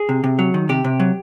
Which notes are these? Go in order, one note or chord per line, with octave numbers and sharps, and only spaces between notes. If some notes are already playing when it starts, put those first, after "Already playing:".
Already playing: G#4
C3
C3
F#3
D#3
C3 G4
C3
F#3